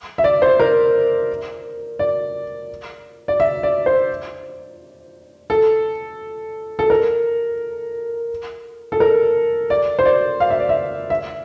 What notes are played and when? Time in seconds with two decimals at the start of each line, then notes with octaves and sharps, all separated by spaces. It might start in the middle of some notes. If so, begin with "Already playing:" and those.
0.18 E5
0.24 D5
0.42 C5
0.60 A#4
1.99 D5
3.28 D5
3.40 E5
3.63 D5
3.86 C5
5.50 A4
6.79 A4
6.90 A#4
8.92 A4
9.00 A#4
9.70 D5
9.99 C5
10.05 D5
10.40 F5
10.50 E5
10.60 D5
10.69 E5
11.10 E5